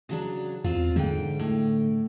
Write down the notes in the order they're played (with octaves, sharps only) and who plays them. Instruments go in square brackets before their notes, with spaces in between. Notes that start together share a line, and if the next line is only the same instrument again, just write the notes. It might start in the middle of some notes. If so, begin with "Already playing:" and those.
[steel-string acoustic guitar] C#3 F#3 D4
[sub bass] E2 [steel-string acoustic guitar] C4 F4
[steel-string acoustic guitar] G#2 G5 [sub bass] D3
[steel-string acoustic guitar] A2